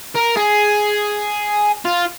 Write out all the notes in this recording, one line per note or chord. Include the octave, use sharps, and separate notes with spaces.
A#4
G#4
F4